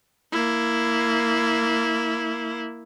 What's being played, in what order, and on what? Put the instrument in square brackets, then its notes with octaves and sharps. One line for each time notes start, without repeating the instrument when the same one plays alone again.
[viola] A#3 E4